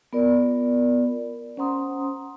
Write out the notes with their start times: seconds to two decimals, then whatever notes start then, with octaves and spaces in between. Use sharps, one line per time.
0.13 B3 F4 A#4 D5
1.57 C#4 C5 F#5 A#5 C6 D#6